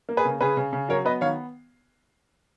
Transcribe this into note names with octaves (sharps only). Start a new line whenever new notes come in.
A#3
G#4 B4
C#3
C#3 G#4 B4
C#3
C#3
F#3 A#4 C#5
B3 B4 D#5
D#3 C#5 F5